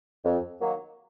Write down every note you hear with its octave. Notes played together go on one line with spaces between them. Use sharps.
F2
D#3 F#3 A#3